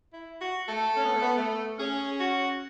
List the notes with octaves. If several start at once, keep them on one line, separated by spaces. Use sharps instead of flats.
E4
F#4
A3 A4
C#4
B3
A3
B3
A3
C#4 G#4
F#4